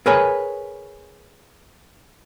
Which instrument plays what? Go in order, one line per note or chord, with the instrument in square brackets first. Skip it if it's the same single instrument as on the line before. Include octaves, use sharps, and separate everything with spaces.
[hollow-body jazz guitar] G#4 A#4 B4 C#5 G#5